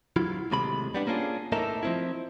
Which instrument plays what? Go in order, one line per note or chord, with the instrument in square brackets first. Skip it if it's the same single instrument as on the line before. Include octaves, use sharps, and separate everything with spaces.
[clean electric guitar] F#3 E4 F4
D#2 A2 C3 G#3 B5
G3 B3 D4
A#3 C#4 D4 F4 G#4
A2 A#3 D#4 A4 A#4 E5
F3 C4 E4